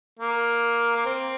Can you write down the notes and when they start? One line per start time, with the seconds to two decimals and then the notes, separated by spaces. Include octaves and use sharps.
0.19 A#3
0.96 A#3
1.06 C4